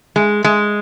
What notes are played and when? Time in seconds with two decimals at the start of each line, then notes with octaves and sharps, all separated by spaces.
0.16 G#3
0.44 G#3